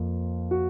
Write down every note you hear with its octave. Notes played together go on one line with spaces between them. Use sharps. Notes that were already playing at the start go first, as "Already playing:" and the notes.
Already playing: F2 F3 A#3
F#4